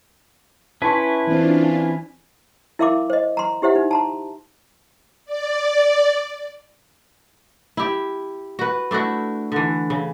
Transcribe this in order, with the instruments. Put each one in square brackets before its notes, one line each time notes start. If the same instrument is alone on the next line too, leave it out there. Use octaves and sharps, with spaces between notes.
[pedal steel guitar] C#4 E4 B4 [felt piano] A5 C6 C#6
[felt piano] E3 C4 [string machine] D4 F4
[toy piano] E4 A#4 E5 F5 C6 D6
C5 D#5
A#5 C6
E4 G4 C5 E5 F#5
D#4
A5 A#5 C6
[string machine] D5
[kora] E4 G4
F#4 B4
A3 D4 E4 F#4
D3 E3
C#3